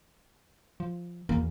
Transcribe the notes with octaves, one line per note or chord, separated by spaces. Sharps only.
F3
E2 A#3